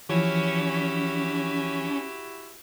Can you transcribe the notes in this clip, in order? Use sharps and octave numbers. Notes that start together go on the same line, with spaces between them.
E3 F3 C#4 E4 F#4 G4